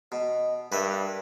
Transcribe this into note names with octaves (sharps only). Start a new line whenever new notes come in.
B2 D#5
G2 A#4 B4 E5